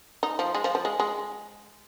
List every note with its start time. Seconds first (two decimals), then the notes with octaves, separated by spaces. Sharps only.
0.23 D#4
0.39 F3
0.54 G#3
0.64 F3
0.75 F3
0.85 G#3
1.00 G#3